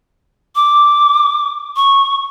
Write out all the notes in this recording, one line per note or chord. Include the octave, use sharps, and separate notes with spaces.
D6
C#6